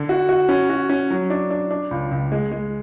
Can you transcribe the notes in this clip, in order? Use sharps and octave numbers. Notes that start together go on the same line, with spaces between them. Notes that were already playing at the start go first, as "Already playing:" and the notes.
Already playing: D3
F#4
F#4
C#4
F#4
C#4
F#3
D4
D4
D4
C#2
C#2
G#3
G#3